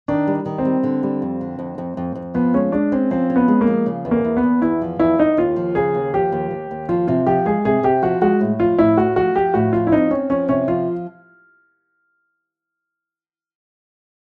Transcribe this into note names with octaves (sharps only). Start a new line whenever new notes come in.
D#3 D4
G3
D#3
C4
G3
D3
G3
F2
D3
F2
F2
F2
F2
F3 B3
G#3 C#4
G#3 D4
C4 C#4
F3 C4
C#4
B3
G#3
A#3
F3
C#3
E2
A#3
E2
B3
E2
E2 E4
F3
E2 E4
E2 D#4
D#2 F4
F3
C#3 G#4
D#2
F3 G4
D#2
D#2
D#2
F3 F4
C3 F4
F3 G4
G#3 G#4
C3 G#4
C3 G4
F3 F#4
G#3 F#4
A2
F3 F4
A2 E4
A3 F#4
F3 F#4
F3 G4
A2 F#4
F3 F4
E4
C4 D#4
C4 C#4
F3 C#4
C3 C#4
F3 F4